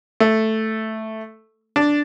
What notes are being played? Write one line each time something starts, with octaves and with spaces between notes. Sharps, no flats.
A3
D4